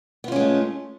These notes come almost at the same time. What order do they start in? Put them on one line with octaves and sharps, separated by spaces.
B3 F4 C#4 G#3 A3